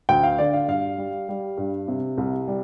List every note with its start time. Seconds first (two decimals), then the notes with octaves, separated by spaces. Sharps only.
0.09 D2 G5
0.23 F5
0.38 D3 D5
0.53 F5
0.68 G2 F5
0.98 G3
1.29 G3
1.58 G2
1.88 C3
2.18 C2
2.48 G3